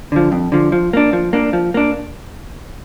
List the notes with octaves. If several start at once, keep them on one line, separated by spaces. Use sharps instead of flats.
D3 F3
F2
D3 F3
F3
A#3 D4
F3
A#3 D4
F3
A#3 D4